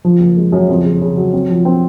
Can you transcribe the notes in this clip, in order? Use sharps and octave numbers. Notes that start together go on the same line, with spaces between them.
F3
F#1
G#3
F#2
F2
C#3
C#3
F#3
C4
F3
C4